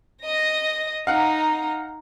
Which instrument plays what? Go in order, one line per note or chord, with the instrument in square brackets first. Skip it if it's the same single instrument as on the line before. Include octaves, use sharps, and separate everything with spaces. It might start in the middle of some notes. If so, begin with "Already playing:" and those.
[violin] D#5 A#6
[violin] D#4 A#5 [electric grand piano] F5 F#5